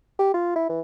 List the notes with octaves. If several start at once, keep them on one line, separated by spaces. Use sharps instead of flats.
G4
F4
E4
E3